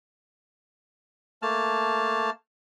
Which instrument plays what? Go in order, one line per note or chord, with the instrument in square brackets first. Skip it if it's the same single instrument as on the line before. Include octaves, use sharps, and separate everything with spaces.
[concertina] A3 A#3 A5 F6